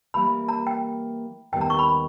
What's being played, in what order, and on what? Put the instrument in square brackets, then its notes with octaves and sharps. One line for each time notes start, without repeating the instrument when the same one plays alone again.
[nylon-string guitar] E3 G3 A#3 [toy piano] B5
[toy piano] A#5
G5
[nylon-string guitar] D#2 D#3 G3 B3 [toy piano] G5
[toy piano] A#5
C#6
B5